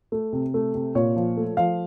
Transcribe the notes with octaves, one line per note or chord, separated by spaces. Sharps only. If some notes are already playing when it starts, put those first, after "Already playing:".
A3
C3
A3
C3
A#2 C#5
F3
A3
F3 F5